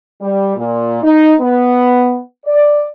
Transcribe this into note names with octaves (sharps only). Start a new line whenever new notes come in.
G3
A#2
D#4
B3
D5